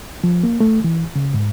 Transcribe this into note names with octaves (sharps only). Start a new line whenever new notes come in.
F3
A#3
A3
E3
C#3
G#2